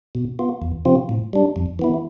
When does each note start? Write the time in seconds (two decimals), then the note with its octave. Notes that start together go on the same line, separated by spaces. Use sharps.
0.15 B2
0.39 B3 F4
0.62 E2
0.85 C3 F3 C4 F4
1.09 A2
1.33 G3 D4
1.56 F2
1.79 E3 B3 E4